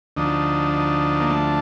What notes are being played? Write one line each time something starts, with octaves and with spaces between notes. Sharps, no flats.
D2 D3 F3 D#4
D#4
A#3
A3